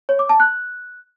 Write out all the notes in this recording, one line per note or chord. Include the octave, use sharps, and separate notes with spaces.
C#5
D6
A5
F#6